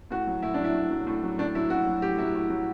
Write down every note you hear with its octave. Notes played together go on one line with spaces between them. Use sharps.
A2 F#4
F#3
A2 E4
D4
F#3
E4
A2
F#3
A2
F#3
A2 D4
F#3 E4
A2 F#4
F#3
A2 G4
F#3 E4
A2
F#3